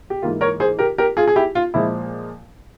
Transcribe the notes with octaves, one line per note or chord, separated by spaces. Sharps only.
G4
G#2 E3 A#3 F4
A#4 C#5
G#4 C5
G4 A#4
G4 A#4
F4 G#4
G#4
E4 G4
F4
A#2 F3 G#3 E4